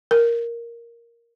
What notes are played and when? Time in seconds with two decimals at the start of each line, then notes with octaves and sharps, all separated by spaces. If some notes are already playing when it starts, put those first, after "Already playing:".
0.11 A#4